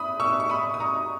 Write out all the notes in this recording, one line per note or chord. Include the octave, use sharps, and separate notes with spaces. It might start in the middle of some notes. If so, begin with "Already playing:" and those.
Already playing: B5 D#6
C#6 E6
C#6
B5 D#6
D#6
A#5 C#6